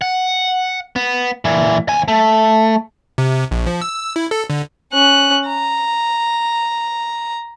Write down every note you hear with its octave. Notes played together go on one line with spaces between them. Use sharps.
F#5
B3
A#2 E3
D#2 G#5
A3
C3
A#1
F3
E6
E4
A4
D3
C#4 F#6
A#5